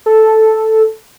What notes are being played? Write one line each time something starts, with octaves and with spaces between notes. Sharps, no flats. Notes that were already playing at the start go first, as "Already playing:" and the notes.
A4